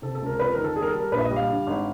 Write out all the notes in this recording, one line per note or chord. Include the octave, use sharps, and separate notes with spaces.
C3 A4
A4
C#2
A#4
F2 B4
D#3 A#4
A4
G3 G#4
A#4
A4
G3
A#4
A#1 B4
E5
D#5
G3
F5
D3
G#1